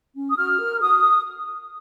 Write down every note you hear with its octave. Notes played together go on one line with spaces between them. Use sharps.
C#4
D#6
F#4 F6
A#4
F#4 D#6